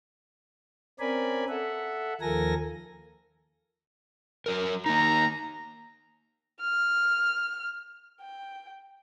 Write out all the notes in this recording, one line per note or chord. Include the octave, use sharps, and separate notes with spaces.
C4 C#4 A#4 D5 G#5 B5
A4 E5 F#5
D#2 F3 A4 A#4 G#5 A#6
F#3 A#4
A#3 D#4 A#5
F6
G5